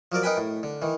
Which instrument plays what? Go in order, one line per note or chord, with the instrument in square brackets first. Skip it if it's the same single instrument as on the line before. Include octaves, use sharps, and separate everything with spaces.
[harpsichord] F3 F#3 A#4 D5
D#4 A#4 B4 G5 G#5 B5
A2
D3
D#3 E3